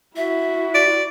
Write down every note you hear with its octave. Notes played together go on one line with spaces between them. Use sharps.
E4 F#4 E5
D5